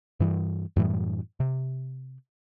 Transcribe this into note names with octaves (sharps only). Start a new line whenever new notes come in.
G2 E3 G3
F#2 A2 E3 G3
C3